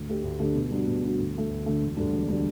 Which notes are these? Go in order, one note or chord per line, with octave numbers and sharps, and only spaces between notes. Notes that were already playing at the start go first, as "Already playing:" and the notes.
Already playing: D2
D3 A3 D4 G4
D2
D3 A3 D4 G4
B2
G3 D4 F#4
B2
G3 D4 F#4
D2
D3 A3
D2
D3 A3
E1
D2 D3 G3 D4
E1
D3 G3 D4